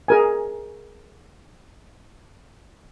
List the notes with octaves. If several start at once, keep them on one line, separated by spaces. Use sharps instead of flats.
G#4 A#4 G#5